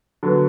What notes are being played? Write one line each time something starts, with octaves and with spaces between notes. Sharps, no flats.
D3 F#3 B3 F#4